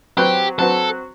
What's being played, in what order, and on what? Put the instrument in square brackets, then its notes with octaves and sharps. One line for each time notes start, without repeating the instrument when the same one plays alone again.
[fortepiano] F#3 C4 F#4 B4 [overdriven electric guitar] G4
[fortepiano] F#3 C4 F#4 B4 [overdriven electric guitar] A4